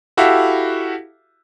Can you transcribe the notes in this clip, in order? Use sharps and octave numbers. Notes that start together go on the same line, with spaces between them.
E4 F#4 G4 A4 E5 F5